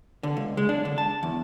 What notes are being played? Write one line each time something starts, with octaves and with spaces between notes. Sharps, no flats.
D3
C#2
G#3
D4
D3
A5
E2